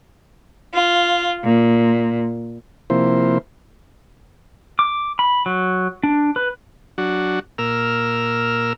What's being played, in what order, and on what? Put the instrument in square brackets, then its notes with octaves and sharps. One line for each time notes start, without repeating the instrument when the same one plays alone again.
[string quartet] F4
A#2
[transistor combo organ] C3 F3 A#3 E4 C5
[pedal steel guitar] D6
B5
F#3
D4
B4
[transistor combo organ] F#3 D4 F#4
A#2 A#4 E6 F6